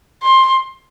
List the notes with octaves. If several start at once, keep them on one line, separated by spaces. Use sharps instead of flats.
C6